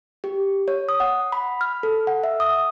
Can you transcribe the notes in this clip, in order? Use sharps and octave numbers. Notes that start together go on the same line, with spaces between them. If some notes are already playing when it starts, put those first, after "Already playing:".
G4
C#5
D#6
F#5
B5
F6
A4
F#5
E5
D#6